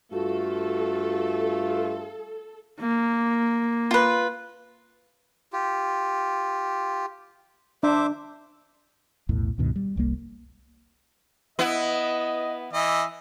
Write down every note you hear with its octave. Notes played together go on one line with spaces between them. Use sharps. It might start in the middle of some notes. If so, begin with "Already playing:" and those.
G2 A3 F4 F#4 A4
A#3
F4 B4
F4 G4
D4 C5 E5 D6
B1 E2 A2 E3
C#2 G2 B2 D#3
G3
F1 C2 G3 A#3
B3 E4 D#5
E3 D#5 E5